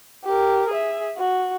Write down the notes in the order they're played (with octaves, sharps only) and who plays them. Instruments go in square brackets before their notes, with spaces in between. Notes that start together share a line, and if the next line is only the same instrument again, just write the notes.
[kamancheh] G4 A#4
G#4 E5
F#4